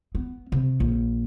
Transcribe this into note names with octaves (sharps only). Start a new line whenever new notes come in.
B3
C3
A#1